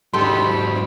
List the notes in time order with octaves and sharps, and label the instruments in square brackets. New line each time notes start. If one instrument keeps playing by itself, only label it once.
[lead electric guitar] G#2 F#3 [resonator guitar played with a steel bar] D#3 G4 A4 [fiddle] D4 B5 [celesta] C6